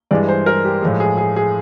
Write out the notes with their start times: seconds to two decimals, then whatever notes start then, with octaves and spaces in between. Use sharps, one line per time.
0.11 G2 E3 G#3 D5
0.29 C5
0.46 A#4
0.65 G4
0.82 A2 F3 G#3
1.00 G#4
1.18 G#4
1.36 G#4